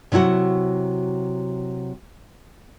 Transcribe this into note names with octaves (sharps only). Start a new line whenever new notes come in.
C3 F#3 E4 F#4 F#5